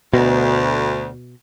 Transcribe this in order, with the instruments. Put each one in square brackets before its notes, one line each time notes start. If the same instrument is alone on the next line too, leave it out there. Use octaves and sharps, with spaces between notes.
[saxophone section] D2 [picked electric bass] B2